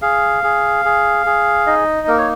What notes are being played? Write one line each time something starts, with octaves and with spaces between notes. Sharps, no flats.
G#4 F5
G#4
G#4
G#4
D#4 D#5
A#3 A#4
C#5